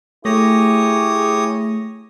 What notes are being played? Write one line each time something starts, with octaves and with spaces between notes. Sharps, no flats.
A3 E4 G4 G#4 C#5 D#6 A#6